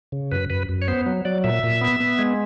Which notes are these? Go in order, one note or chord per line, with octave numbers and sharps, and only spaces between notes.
C#3
F#2 B4
F#2 B4
F#2
C#5
B3 C5
F#3
F#3 D5
A#2 E5
A#2
B3
B3
G#3